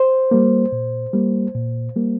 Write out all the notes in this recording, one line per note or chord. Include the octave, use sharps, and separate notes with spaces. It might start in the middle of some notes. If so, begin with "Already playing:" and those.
Already playing: C5
G3 A#3
A#2
G3 A#3
A#2
G3 A#3